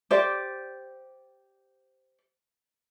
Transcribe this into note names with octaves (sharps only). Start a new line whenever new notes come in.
G4 C5 D5